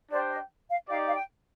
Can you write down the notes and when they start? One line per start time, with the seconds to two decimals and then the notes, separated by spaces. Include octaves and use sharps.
0.11 D4 G4 C5 D5 G5
0.31 D#5
0.70 F5
0.88 D#4 G4 D5 F5
1.08 F5
1.14 G5